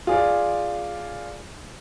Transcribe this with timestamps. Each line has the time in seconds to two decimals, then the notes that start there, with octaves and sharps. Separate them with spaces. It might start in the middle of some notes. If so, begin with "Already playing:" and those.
0.07 F4 G#4 D5